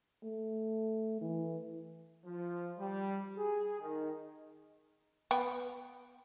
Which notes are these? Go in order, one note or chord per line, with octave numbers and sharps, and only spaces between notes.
A3
E3
F3
G3
G#4
D#3
B3 G5